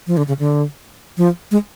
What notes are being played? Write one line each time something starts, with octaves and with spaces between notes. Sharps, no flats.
F3
D3
C#3
D3
F3
G#3